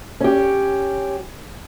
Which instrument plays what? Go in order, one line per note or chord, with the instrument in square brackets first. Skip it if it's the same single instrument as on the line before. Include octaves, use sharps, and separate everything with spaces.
[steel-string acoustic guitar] C#4 G4